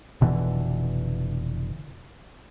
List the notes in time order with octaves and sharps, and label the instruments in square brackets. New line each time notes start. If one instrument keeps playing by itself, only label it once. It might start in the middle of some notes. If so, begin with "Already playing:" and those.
[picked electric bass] F1 B2 D3 E3